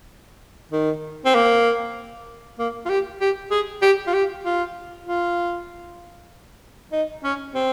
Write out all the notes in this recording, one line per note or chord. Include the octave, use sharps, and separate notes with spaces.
D#3
C4
A#3
A#3
F4
G4
G4
G#4
G4
F4
G4
F4
F4
D#4
C#4
C4